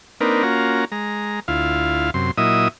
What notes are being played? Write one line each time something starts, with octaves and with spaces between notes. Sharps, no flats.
A#3 C4 D4 D#4 A#4 B4
A#3 C#4 F4 F#4 A#5
G#3 A#5
D2 E4 F4 F5
F#2 C3 C6
A#2 F#3 E4 D#5 E5 D#6